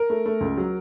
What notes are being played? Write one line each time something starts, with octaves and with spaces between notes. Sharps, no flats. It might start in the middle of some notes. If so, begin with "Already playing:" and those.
Already playing: A#4
A3
A3
C#2
F#3